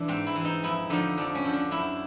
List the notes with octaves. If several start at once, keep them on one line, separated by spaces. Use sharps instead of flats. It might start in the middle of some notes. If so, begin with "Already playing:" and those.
Already playing: E3 D4
G#2 C4
E4
E3
D#4
F2 E4
D3 F3 D#4
F2 D4
C#4
D3 F3
D4
F#2 E4